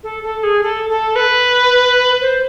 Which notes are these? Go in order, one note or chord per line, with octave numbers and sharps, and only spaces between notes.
A4
A4
G#4
A4
A4
B4
C5